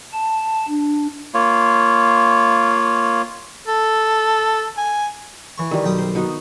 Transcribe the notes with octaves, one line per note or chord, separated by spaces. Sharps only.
A5
D4
A#3 F4 C#5
A4
G#5
E3 C#6
D#3 G3
B1 G5 D#6
C5
B3 D#4 F#4